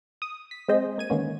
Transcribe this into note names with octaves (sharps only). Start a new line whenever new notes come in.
D#6
B6
G#3 C4 G#4 C5 D#5
A#3 G#6 D#7
D3 D#3 G#3 A#3 B3 C#4